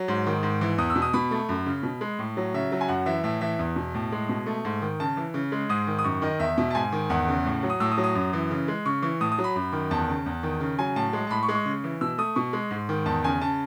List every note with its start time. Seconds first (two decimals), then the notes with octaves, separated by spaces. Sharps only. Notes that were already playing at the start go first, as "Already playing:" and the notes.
Already playing: F#3
0.08 G#2
0.26 D#3
0.43 G#2
0.61 E3
0.78 E2 D#6
0.90 E6
0.96 B2
1.02 D#6
1.13 B2 B5
1.31 A3
1.49 F#2
1.66 C#3
1.83 B2
2.01 G#3
2.19 A2
2.37 F#3
2.54 C#3 E5
2.72 F#3
2.81 G#5
2.88 F#2 F#5
3.06 E3 E5
3.24 A2 E5
3.41 E3 E5
3.59 E2
3.76 B2
3.94 A2
4.12 G#3
4.29 B2
4.46 A3
4.65 G#2
4.82 D#3
5.00 C#3 A5
5.17 E3
5.34 C#3
5.52 G#3
5.69 G#2 D#6
5.87 D#3
5.99 D#6
6.04 F#2 C#6
6.22 D#3 D#5
6.40 E2 E5
6.58 B2
6.71 A5
6.75 G#2 G#5
6.92 D#3
7.10 E2 F#5
7.28 C#3
7.45 A2
7.63 F#3
7.70 D#6
7.80 A2 E6
7.92 D#6
7.98 F#3
8.04 D#6
8.15 F#2
8.33 E3
8.50 C#3
8.68 G#3
8.86 C#3 C#6
9.02 E3 C#6
9.20 A2 D#6
9.32 D#6
9.39 F#3
9.44 B5
9.55 F#2
9.72 D#3
9.91 E2 A5
10.09 C#3
10.26 E2
10.43 D#3
10.60 C#3
10.79 F#3 G#5
10.96 A2 A5
11.13 G#3
11.27 A5
11.30 A2 B5
11.43 C#6
11.49 G#3
11.55 C#6
11.65 C#3
11.84 E3
12.01 B2 E6
12.18 A3 D#6
12.36 B2 C#6
12.53 G#3
12.71 G#2
12.89 D#3
13.06 E2 A5
13.24 C#3 G#5
13.41 C#3 A5